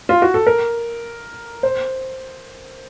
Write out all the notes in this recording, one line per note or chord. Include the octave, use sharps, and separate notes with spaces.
F4
F#4
A4
A#4
C5